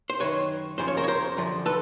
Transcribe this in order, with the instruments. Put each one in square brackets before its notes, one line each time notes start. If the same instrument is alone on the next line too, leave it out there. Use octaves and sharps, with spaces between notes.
[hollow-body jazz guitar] C5
F#2 D#3 B4 C#5
F2 C#3 F3 C5
C#5
A#4 C5
C#5
A#4 C5
F#2 D3 F3
A4 B4